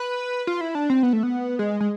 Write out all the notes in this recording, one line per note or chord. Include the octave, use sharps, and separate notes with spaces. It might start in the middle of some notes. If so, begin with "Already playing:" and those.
Already playing: B4
F4
E4
D4
C4
B3
A3
B3
G#3
G#3